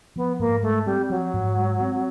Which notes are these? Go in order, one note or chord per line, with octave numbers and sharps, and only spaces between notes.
F3 B3
G#2 A#3
G#3 A3
G3 C4
F3 F#3
G#2
G#3
C4